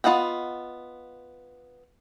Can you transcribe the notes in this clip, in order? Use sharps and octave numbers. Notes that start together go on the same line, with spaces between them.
B3 F4 D#5 F#5 G5